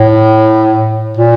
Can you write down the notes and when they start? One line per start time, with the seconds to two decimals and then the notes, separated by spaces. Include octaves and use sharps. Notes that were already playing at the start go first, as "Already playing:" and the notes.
Already playing: A2
1.17 A#2